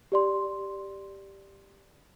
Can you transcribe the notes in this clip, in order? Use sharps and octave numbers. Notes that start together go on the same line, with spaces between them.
G4 D5 C6